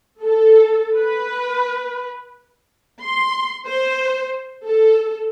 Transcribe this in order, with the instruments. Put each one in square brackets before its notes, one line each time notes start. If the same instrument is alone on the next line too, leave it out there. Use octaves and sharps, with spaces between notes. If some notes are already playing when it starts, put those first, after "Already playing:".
[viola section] A4
B4
C6
C5
A4